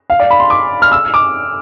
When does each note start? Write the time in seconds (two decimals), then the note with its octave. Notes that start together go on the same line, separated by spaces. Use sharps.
0.10 F5
0.20 D5
0.30 B5
0.40 C6
0.50 D6
0.82 F6
0.92 E6
1.14 D6